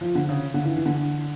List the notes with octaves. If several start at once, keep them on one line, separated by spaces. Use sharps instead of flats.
F3
D3
C#3
D3
E3
E3
D3